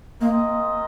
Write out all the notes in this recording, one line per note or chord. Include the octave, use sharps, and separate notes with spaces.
A#3 C4 F4 A#4 D#5